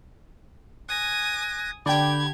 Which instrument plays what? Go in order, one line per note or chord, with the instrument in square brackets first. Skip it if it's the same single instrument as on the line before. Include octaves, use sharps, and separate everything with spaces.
[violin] G#5 D#6 [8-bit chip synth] F#6 G#6 A#6
[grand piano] D3 [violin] G4 G#6 [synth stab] D5 G5 [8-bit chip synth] B5